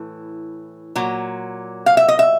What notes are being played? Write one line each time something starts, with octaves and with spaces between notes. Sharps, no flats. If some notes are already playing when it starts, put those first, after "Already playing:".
Already playing: A2 E3
A#2 F#3
F5
E5
D#5
E5